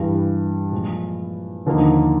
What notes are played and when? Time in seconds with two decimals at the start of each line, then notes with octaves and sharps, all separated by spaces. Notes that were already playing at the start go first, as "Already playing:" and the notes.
Already playing: G2 E3 G3
0.71 A#2 F3 G#3
1.66 D#2 D3 F3 A#3 D#4